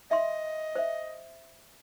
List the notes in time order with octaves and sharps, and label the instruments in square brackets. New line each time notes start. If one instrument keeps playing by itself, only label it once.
[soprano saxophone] D#5 [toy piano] E5 B5 C6
[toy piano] C5 E5